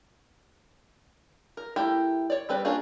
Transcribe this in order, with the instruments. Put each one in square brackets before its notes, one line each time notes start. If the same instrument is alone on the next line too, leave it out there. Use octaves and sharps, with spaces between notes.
[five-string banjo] A#4
A3 E4 G4 A#4
C#5 D5
G3 C4 B4 D5
A#3 C#4 D4 F4 G#4